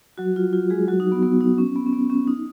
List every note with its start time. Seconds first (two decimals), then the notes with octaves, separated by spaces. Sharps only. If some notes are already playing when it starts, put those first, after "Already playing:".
0.18 F#3 F#4
0.36 F4
0.53 F4
0.70 G#3 G#4
0.88 F#3 F#4
1.00 D#4
1.12 B3
1.23 B3
1.41 D#4
1.58 C#4
1.76 B3
1.86 C#4
1.93 B3
2.10 C#4
2.27 D#4